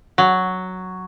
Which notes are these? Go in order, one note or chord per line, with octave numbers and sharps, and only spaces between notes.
F#3